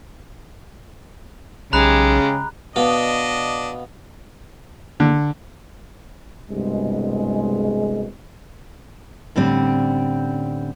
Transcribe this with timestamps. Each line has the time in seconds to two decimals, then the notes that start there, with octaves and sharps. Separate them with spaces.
1.73 B1 C#3 G#3 G4 A#5 B5 F#6
2.76 B2 B3 D4 D#5 F5
5.00 D3
6.50 C2 G2 B2 G#3
9.36 A2 D3 G3 C4 C#4